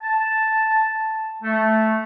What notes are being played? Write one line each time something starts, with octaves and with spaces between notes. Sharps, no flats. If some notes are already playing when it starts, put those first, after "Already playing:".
A5
A3